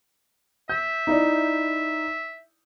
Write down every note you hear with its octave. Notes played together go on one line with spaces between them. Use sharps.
E5 G6
D#4 E4 D5